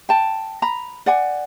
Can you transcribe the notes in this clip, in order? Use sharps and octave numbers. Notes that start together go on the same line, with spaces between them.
G5 A5
A#5 B5
D5 F#5 G#5